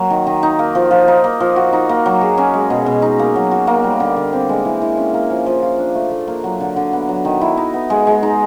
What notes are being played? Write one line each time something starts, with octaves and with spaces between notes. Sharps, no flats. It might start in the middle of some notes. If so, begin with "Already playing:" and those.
Already playing: F#3 A#3
D#3
D#3
D#4
A#3
F3
F3
D#4
A#3
F3
F#4
D#4
A#3
F#3
G#4
C#4
G#3
B2
B2
D#4
A#3
F#3
F#4
A#3
G3
D3
D3
C4
G#3
E3
E3
C#4
A#3
F3
F3
F4
D4
A3
A3
A#3
F#3
D3
D3
B3
F#3
D#3
E4
D#4
B3
G#3
G#3
D#4